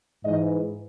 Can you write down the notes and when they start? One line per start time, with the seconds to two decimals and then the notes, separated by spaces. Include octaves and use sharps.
0.24 G#2 E3 D#5